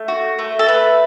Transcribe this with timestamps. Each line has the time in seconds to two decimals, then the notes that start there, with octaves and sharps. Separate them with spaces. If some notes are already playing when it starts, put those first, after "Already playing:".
Already playing: A3
0.08 F#4
0.39 A3
0.59 A4
0.68 A3 B4